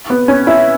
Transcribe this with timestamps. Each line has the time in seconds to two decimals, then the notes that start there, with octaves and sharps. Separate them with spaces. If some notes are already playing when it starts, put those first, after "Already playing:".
0.10 B3
0.28 C#4
0.47 E4